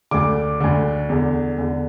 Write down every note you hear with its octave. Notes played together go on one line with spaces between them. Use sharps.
D2 D3 D6
D2 D3
E2 D3
E2 D3